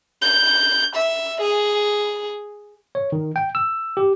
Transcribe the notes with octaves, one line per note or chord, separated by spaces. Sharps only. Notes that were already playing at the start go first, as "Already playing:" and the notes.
G6
E5
G#4
C#5
D#3
G5
E6
G4